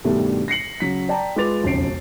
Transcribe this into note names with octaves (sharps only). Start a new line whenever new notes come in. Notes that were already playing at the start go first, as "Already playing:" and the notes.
G2 B2 D#3 G3 A3 D4
A#6 C7 C#7 F#7
C#3 F#3 B6
D5 G5 A5 A#5
G#3 F4 B4 D6 A6 F7
E1 B1 F2 C#3 C7 D7